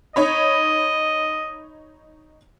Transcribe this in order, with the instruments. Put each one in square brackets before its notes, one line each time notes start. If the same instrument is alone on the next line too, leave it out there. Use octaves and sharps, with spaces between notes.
[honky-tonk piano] D#4 C#5 B5 [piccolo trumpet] D#5